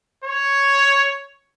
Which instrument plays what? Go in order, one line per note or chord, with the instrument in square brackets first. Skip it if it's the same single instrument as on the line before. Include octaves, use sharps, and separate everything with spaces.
[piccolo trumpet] C#5